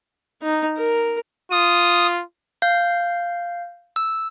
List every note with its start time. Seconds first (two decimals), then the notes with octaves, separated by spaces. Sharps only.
0.42 D#4
0.77 A#4
1.51 F4 D#6
2.62 F5 G6
3.96 E6